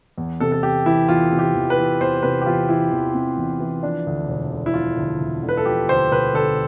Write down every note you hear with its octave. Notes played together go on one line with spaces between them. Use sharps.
E2
C3 A4
A4
E2 G4
E3 E4
E2 F4
C3
G4
E2
B4
E3
E2 C5
C3 B4
G4
E2 F4
E3 E4
E2
C3
E2
E3
F3 D4
D2
E1
D3
E4
F3 F4
D2
E1
D3
B4
A4
F3 G4
D2 C5
E1 B4
D3 A4